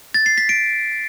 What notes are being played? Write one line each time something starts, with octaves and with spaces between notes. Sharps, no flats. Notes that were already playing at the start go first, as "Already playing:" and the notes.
A6
C7
B6
D7